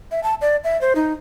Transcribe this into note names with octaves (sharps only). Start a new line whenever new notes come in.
E5
A5
D5
E5
C5
D#4